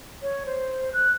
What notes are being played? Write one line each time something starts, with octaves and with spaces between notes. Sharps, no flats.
C#5
C5
F#6